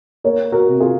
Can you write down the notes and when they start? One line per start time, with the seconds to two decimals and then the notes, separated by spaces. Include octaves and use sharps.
0.24 A#3 A#4 C#5
0.52 F#4 A#4
0.67 C3
0.80 F4 G#4